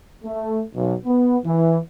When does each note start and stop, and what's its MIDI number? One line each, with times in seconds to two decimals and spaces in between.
0.24 0.60 57
0.74 0.93 35
1.05 1.37 59
1.44 1.77 52